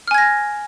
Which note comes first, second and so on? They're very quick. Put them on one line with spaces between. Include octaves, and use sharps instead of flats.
F6 G#5 G#6 A#6